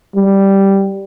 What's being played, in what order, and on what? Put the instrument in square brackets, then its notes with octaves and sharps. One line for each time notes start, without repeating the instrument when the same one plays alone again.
[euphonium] G3